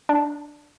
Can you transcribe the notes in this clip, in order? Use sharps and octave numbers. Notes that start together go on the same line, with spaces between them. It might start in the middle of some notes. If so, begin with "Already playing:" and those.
D4